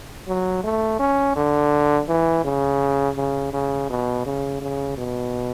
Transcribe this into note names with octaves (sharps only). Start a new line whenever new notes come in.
F#3
A3
C#4
D3
E3
C#3
C#3
C#3
B2
C#3
C#3
B2